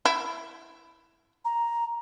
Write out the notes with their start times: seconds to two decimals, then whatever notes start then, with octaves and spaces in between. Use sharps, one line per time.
0.05 E4
1.45 A#5